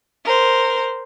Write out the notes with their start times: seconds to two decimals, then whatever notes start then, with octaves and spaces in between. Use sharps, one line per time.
0.25 A#4 C5